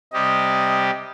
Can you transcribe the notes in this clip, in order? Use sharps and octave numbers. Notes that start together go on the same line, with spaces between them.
C3 G3 G4 D#5